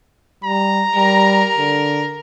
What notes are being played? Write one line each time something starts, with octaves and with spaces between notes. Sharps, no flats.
G3 A#5
G3 A#4
D3